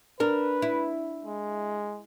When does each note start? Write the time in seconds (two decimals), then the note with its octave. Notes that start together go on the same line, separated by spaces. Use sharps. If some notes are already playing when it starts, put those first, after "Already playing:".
0.20 D4 A#4 B4
0.62 E4
1.25 G#3